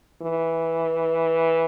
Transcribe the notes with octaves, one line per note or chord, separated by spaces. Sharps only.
E3